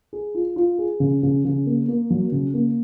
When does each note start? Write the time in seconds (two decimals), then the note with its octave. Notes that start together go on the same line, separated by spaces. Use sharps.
0.13 G#4
0.35 F4
0.56 F4
0.78 G#4
1.00 C#3
1.23 C#3
1.45 C#3
1.66 A#3
1.88 A#3
2.10 F#3
2.32 C#3
2.54 A#3